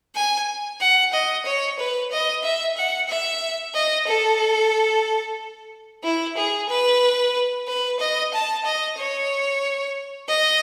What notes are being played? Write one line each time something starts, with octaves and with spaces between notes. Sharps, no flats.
G#5
F#5
D#5
C#5
B4
D#5
E5
F#5
E5
D#5
A4
E4
G#4
B4
B4
D#5
A5
D#5
C#5
D#5